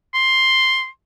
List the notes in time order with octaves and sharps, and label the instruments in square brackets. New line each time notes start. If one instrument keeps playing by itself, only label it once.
[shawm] C6